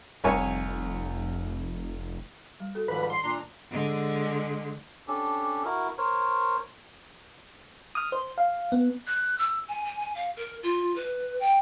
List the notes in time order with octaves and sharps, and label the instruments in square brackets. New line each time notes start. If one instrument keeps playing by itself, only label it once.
[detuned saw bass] F1 [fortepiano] C2 C#5 G#5
[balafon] G3
F#4 A4
[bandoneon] G#2 F3 G3 [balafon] D#3 [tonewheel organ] B4
[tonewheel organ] C6
[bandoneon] A#2 D4 A#5
[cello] D3 G#3
[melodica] C#4 D4 G4 A4
E4 F#4 A#4
A#4 C5 C#5
[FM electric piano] D#6 F6
C5
F5
B3
[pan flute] F#6
E6
G#5
G#5
G#5
F5
A#4
F4
B4
G5